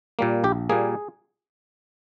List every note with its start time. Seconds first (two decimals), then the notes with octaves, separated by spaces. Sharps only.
0.19 A#2 G3 A#3
0.44 A#1 G4
0.69 A#2 G3 A#3 G#4